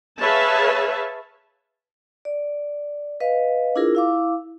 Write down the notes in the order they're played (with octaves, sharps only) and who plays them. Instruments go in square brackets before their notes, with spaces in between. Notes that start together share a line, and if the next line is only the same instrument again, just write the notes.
[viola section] G#4 B4 C#5 E5 F5 A5
[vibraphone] D5
B4 D#5 F5
D4 E4 F4 G#4 A#4
E4 F5 D6